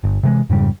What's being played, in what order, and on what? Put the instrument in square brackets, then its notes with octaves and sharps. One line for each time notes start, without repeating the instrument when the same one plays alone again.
[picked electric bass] G1
C3 E3 F#3 G#3
F2 G#2 C#3 G3